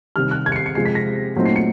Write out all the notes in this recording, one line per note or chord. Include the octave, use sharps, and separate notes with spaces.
C3 D#3 G3 F6
F#6
G#6
C#7
C7
C#7
C3 F3 G#3 C7
B6
A#6
A#2 F#3 A3 C4 D#4
C7
C#7